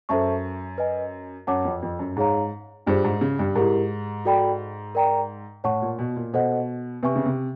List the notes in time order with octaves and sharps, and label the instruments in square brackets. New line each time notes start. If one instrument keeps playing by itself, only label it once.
[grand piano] F#2 [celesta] A4 C5 E5 A5 C#6
[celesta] B4 D#5 G#5
[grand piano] F#2 [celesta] C#5 F#5 A5 D6
[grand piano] F2
F2
F#2
[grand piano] G#2 [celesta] D#4 G#4 C#5 F5 A#5
[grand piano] G2 [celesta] D4 F4 G#4 C5
[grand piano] G#2
C#3
G2
[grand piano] G#2 [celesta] E4 G4 A#4
[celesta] F#4 A4 D5 G5 B5
A#4 D5 G5 A#5
[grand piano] A2 [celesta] C#5 F#5 A5 C#6
[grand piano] A#2
B2
A#2
[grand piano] B2 [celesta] A4 C5 D#5 F#5
[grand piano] C3 [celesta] B4 E5 G#5 C#6
[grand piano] C#3
C3